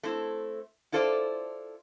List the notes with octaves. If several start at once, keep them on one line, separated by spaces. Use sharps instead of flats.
A3 C4 E4
E4 F4 A4 C5 D5